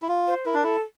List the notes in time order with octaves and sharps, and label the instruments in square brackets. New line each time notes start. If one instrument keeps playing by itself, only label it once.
[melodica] E4
F4
[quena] C5
[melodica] E4 [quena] A#4
[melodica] D4
[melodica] E4 [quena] A4